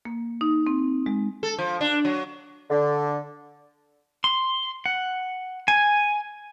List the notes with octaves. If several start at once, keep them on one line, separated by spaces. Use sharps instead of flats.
A#3
D#4
C4
G#3
A4
F3
D4
F#3
D3
C6
F#5
G#5